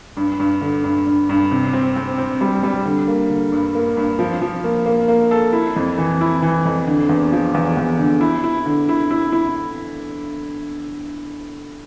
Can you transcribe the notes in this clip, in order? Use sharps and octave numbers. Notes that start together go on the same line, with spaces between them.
G2
G2
D3
G2
G2
G2
C3
C4
C4
C4
G3
G3
D3
A#3
D3
G2
A#3
G2
F3
F3
A#3
A#3
A#3
A4
E4
F2
E3
E4
E3
F2
D3
E2
F3
E2
E2
D3
E4
E4
D3
E4
E4
E4